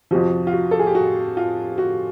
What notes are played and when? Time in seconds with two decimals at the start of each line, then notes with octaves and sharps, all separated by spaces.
0.11 F2 C3 F3 F#4
0.47 F4
0.53 F#4
0.71 A4
0.79 G#4
0.87 G4
0.95 F#4
1.37 F4
1.78 F#4